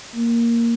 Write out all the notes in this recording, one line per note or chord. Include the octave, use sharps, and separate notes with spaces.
A#3